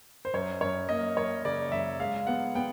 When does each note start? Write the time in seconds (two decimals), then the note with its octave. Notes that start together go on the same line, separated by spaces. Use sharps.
0.25 C5
0.34 F#2 C#5
0.61 F#2 C#5
0.89 A#3 D#5
1.17 F#2 C#5
1.45 C#3 D5
1.72 F#2 E5
2.00 G#3 F5
2.27 B3 F#5
2.55 B3 G5